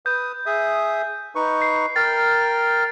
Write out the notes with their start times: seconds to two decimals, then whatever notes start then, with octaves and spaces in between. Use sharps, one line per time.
0.06 B4 D#6 G6
0.46 G#4 E5 D#6
1.35 D#4 B4 C#6
1.62 C7
1.96 A#4 G5 F6 A6